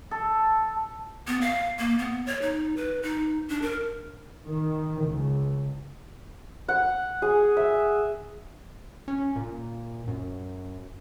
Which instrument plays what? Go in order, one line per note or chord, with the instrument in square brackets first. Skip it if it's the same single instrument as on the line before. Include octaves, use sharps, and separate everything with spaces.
[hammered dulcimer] A4
[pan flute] B3
F5
A#3
B3
C#5
D#4
B4
D#4
D4
A#4
[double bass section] D#3
C#2
[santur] F#5
G#4
E5
[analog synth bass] C#4
A#2
F#2